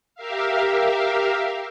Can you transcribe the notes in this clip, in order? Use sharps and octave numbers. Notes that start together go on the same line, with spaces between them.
G4 A#4 E5 F5